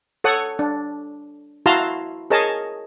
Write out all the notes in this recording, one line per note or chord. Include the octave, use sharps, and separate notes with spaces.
A4 C#5 F#5 D#6
D4
E4 F#4 F5 A5 A#5 C6
G#4 A#4 C#5 D#5 A5